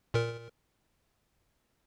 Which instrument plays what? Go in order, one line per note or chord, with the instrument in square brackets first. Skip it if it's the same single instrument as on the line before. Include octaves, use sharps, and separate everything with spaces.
[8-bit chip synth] A#2 A#4